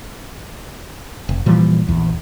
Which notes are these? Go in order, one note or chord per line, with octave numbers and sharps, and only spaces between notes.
F1
A#2 E3 F3 G3
A#1 E2